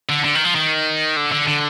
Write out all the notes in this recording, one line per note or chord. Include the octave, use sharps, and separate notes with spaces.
D3
D3
D#3
F3
D#3
D3
D3
D3